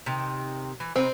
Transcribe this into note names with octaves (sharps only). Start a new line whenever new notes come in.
C3 D#3
E3
C3 C4 D#4 B4